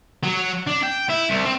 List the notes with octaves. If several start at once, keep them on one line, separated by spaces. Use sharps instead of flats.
F#3
D4
G5
E4
C2
C4